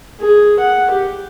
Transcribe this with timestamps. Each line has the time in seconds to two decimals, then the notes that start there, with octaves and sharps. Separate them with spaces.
0.20 G#4
0.59 F#5
0.91 G4